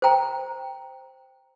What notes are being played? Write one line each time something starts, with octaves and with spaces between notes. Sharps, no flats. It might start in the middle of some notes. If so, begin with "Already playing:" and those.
C5 G5 A#5